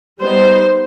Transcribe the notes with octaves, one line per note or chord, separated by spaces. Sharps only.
G3 B3 D#4 C5